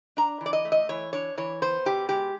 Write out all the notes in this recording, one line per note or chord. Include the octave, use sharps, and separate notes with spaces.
D4 A#5
E3
D5
D#5
A3
D#5
E3 C#5
D4 C#5
E3 C#5
B3 C5
B2 G4
G#3 G4